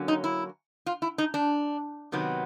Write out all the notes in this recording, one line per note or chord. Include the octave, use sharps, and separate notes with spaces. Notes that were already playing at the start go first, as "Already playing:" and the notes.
Already playing: D3 F#3 A#3 C#4
D#4
E4
F4
E4
D#4
D4
C3 D#3 F#3 B3